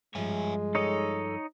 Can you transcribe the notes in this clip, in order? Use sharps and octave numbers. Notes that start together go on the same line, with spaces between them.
G2 F3 G#3 C#5 E5 G#5
D#4 A4 C#5 D#5